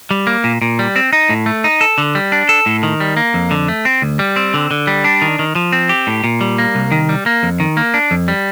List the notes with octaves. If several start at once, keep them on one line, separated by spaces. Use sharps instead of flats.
G3
A#3
A#2
A#2
G3
C4
D#4
A2
A3
D#4
A4
D3
G3
D4
A4
A2
D#3
G3
A#3
F2
D3
A3
C4
D2
G3
C4
D3
D3
G3
D4
D#3
D#3
F3
C4
G4
A2
A#2
G3
A#3
C2
D#3
G3
A#3
F2
D#3
A#3
D4
F2
G3